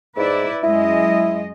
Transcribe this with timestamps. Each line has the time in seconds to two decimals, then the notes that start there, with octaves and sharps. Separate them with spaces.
0.17 G#2 E4 B4 D5
0.63 F#2 G#3 E4 D#5